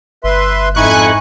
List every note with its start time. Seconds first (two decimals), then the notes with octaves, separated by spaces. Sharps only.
0.24 G1 B4 E5 C6
0.75 F2 G#2 D#4 E4 G#5 C#6 F#6